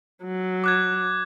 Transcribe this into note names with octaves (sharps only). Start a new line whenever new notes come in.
F#3
D6 F#6 G#6